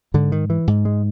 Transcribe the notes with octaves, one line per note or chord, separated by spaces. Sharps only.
G#2 D3
D#3
E3
G#2
G#3